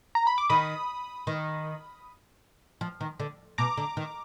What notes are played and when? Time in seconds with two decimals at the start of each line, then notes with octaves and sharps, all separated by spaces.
0.15 A#5
0.27 B5
0.38 D6
0.50 D#3 B5 D#6
1.27 D#3
2.81 F3
3.01 D#3
3.20 D3
3.58 B2 A#5 D6
3.77 D3
3.97 D#3